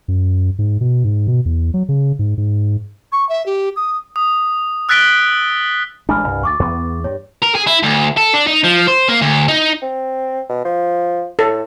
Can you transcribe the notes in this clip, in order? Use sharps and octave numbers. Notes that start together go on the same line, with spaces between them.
F#2
G#2
B2
G#2
B2
E2
F#3
C#3
G#2
G#2
C#6
E5
G4
D#6
D#6
E6 F#6 A6 B6 D7 G7
A1 G#3 D4 G#5 B5 F6
C2 G2
D2 C#6 D6 A6
E2 B3
G2 C#5
A#4
G#4
E4
D2
A4
D4
D#4
F3
C5
A#3
D2
D#4
C4
B2
F3
A2 A4